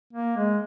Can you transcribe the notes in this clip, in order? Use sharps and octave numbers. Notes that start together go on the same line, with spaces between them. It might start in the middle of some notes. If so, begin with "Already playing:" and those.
A#3
G#3